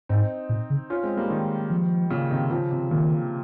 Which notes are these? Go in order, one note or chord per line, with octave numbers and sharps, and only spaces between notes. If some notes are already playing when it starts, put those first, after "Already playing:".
G#2 C4 D#4
A#2
C#3
C#4 F4
G#3 C4
G3 A#3
G#3
D#3 G3
F3
A#2 C#3
C3 D#3
C#3 F3
C3
A#2 D#3